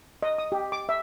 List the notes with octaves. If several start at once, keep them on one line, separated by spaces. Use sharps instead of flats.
D#5
D#6
G4
D6
E5